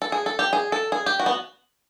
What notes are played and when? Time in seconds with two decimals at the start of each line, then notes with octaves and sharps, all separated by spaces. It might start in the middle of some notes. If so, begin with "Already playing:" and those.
0.02 A4
0.12 G#4
0.26 A4
0.39 G4
0.53 G#4
0.72 A4
0.92 G#4
1.06 G4
1.20 F#4
1.26 B3